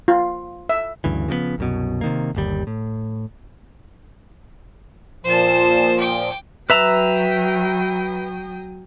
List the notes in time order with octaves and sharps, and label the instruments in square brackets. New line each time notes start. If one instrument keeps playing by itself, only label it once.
[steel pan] F4
E5
[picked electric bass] D2 G2 C#3 E3
C#3 F3 F#3 B3
C2 F#2 B2
C3 D#3 A#3
G1 D#2 G3
A2
[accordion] A#2 F3 [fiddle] C5 A5
[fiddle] G5 D6
[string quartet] F#3 G5 D#6 [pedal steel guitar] B4 E5 A#5